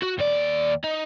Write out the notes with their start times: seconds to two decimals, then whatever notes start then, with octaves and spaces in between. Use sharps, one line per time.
0.02 F#4
0.18 D#2 D5
0.84 D#4